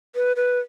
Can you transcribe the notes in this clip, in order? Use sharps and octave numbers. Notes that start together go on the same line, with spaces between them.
B4
B4